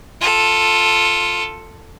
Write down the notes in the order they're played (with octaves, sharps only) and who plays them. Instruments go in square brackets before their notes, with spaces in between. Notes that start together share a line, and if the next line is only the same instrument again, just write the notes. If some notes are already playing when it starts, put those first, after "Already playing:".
[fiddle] F4 A4